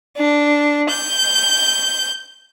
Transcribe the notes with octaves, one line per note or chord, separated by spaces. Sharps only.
D4
G6